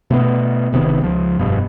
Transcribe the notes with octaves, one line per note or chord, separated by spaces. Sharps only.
B2 A3 B3
E1 C3 D#3 B3
C#2 F3
F1 G2 B2